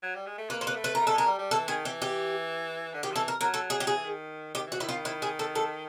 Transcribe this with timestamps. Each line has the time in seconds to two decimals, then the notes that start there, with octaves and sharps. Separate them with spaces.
0.03 F#3
0.15 G3
0.26 G#3
0.38 A3
0.50 A#3 B4
0.61 C5
0.67 B4
0.75 A3
0.84 B4
0.95 A#4
1.01 A3
1.07 A4
1.13 G#3
1.18 A#4
1.26 G3
1.39 G3
1.51 E3 A4
1.67 D#3 G#4
1.85 E3 G4
2.02 G4
2.94 D3
3.03 D#3 G4
3.12 F3
3.15 E3 A4
3.28 A#4
3.41 F#3 A#4
3.54 A4
3.70 G#4
3.80 G4
3.87 G#4
3.96 E3
4.04 D#3
4.54 D#3 G4
4.67 E3
4.72 F#4
4.78 D#3 E4
4.89 F4
5.05 E4
5.22 G#4
5.39 A4
5.55 A4